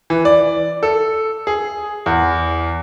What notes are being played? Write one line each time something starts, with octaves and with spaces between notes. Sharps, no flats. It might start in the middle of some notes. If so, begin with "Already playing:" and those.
E3
D5
A4
G#4
E2